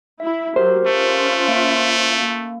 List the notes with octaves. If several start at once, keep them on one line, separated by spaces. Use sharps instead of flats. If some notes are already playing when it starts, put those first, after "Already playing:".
E4 E5
F#3 G4 A#4 C5
A3 C#4 F4
A#3 E5 D7
A#3